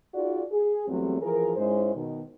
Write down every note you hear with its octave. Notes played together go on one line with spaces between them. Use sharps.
D#4 F4 F#4 G#4 D5
G#4
E2 F#3 G3 A3 C4
E3 F3 G#4 A#4
G#2 G#3 C#4 E4 C5
B2 D#3